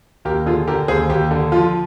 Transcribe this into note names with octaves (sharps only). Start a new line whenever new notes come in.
D#2 G4 A#4
D3 F4 G#4
D3 G4 A#4
D#2 G#4 C5
D#2 G4
D3
F3 F4